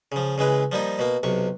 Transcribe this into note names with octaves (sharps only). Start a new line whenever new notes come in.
C#3 F3
C#3 E3 G#3 B4
F3 G3 A#3 D#4
B2 A#3
B1 C3 C#6